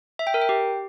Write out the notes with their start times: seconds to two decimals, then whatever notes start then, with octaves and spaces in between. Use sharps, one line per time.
0.19 E5
0.27 G5
0.34 A#4
0.42 G5
0.49 G4